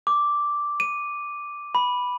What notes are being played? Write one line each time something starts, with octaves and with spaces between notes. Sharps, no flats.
D6
D#7
B5